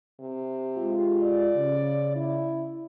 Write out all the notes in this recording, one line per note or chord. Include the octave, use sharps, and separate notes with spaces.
C3
G#3 F4 G4
D5
C#3
E4